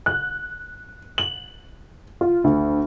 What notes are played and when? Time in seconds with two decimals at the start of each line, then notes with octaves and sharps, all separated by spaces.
0.06 F#6
1.18 F#7
2.21 F4
2.44 D2